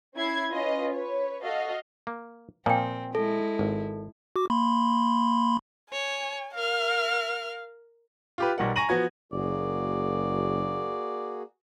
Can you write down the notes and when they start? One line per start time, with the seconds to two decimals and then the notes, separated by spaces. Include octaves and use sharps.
0.15 C#4 E4 G#6 C7
0.51 C#4 F4 B4 D#5
0.92 B4 C#5
1.42 F#4 A4 D#5 F5
2.07 A#3
2.66 A#2 F3 C4 G5 G#5
3.15 G#3 E4 A4
3.59 G#1
4.36 F#4 D6
4.50 A#3 B5 C6
5.92 C#5 G#5
6.54 A#4 F5 F6
8.38 F4 G4 B4
8.58 B1 G3 A#4 F#5
8.76 G#5 A#5 C#6 A#6 D#7 F#7
8.89 F3 B3 F#4 G#6
9.32 F#1 A#3 F#4 G#4 D5